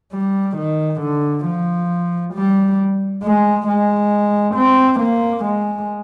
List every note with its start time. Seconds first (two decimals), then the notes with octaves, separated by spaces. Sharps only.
0.13 G3
0.57 D#3
1.02 D3
1.45 F3
2.35 G3
3.23 G#3
3.68 G#3
4.56 C4
5.00 A#3
5.45 G#3